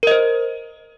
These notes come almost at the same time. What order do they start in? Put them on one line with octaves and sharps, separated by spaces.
A#4 D#5 C5